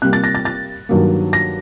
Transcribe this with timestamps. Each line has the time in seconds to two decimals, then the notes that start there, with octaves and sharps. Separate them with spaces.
0.02 C3 G3 A#3 F#6
0.13 A6
0.24 A#6
0.35 A6
0.45 A6
0.89 G2 D#3 F#3 A#3
1.33 A#6